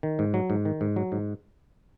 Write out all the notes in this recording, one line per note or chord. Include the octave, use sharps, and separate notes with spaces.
D#3
G#2
F#3
G#2
D#3
G#2
F#3
G#2